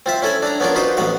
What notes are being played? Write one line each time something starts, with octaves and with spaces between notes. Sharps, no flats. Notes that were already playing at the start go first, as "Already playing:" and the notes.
C4 F4 E5
C#4 E4 A4 G#5 B5
D4 A#5
B3 C#4 D4 F4 A#4
D#4 F4 F#4 B4 C5
A1 B3 F#4 F5